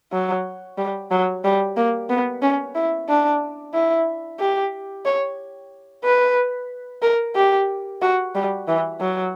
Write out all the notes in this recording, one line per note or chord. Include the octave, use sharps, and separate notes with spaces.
F#3
G3
F#3
G3
A#3
B3
C#4
E4
D4
E4
G4
C#5
B4
A#4
G4
F#4
G3
E3
F#3